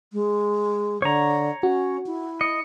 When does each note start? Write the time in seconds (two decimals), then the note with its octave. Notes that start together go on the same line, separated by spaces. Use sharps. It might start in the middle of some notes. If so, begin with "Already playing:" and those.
0.13 G#3
1.02 D3 C#5 A#5
1.63 C#4 F#4
2.06 E4
2.41 D#5 C#7